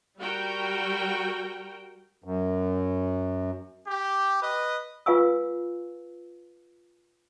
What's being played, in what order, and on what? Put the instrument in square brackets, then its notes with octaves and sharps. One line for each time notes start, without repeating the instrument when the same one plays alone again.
[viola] G3 [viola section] F#4 A#4 G5
[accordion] F#2
[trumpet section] G4
B4 D#5
[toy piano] F4 B4 F5 G#5 C#6 E6